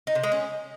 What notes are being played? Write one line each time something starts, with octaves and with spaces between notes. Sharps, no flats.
D#4
C3
G#3
C#4